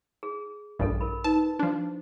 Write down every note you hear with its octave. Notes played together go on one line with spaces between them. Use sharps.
G#4
A#1 G2 A4 D#5
A#4 B5
D#4 B4 A5
F3 D4